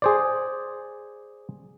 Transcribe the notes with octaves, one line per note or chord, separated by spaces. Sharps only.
G#4 C5 D5